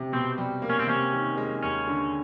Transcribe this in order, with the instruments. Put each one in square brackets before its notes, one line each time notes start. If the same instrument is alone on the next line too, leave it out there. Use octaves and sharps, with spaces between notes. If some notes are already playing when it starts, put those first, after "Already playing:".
Already playing: [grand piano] C3
[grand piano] B2 [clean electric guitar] C4
[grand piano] G3
A#3
[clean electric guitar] C#4
C4
[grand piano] C3 [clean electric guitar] C#4
[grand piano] D#3
G#3
[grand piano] D#2 [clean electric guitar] C#4
[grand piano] D3